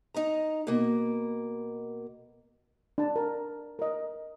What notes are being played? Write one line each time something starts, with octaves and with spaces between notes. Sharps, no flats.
D#4 D#5 A#5
B2 A#3
D4 A5
A#4
A#4 D#5